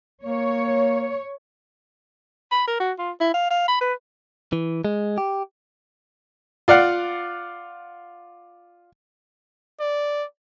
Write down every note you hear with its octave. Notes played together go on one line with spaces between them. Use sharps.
A#3 C#5
B5
A#4
F#4
F4
E4
F5
F5
B5
B4
E3
G#3
G4
F4 D5 F5 F#5
D5